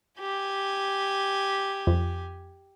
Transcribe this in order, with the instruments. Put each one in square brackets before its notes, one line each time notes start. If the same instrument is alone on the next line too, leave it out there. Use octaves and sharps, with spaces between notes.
[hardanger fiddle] G4 G#5
[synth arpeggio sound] F2